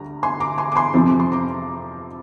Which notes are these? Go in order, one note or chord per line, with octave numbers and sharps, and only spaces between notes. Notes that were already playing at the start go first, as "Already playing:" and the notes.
Already playing: D2 G3 A#5
G#5 C6
A#5 D6
G#5 C6
D6
G#5 C6
F2 C3 F3 C4
D6
C6
A#5 D6